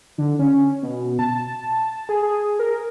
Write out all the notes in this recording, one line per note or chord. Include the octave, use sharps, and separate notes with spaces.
D3
C#4
B2
A5
G#4
G#4
A#4